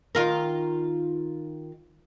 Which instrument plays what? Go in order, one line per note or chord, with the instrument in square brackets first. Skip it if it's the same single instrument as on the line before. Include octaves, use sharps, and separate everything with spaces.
[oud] D#3 F4 A#4